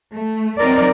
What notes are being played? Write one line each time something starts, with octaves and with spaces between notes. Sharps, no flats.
A3
F#3 C4 D#4 A#4 D5